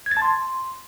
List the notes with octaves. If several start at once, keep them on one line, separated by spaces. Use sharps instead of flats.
G#6
A6
A5
C6